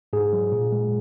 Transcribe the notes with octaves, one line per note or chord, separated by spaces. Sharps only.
G#2 G#4
F#3
A#2
G#3